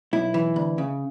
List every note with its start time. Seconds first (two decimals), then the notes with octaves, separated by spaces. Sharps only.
0.13 B1 E4
0.34 E3
0.56 D2
0.78 C#3